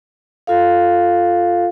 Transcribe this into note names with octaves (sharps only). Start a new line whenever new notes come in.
F4 A4 F5